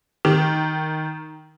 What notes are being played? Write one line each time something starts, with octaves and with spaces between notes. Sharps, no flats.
D#3